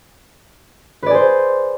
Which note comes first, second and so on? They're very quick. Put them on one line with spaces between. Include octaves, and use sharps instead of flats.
B4 D5 G#4 C5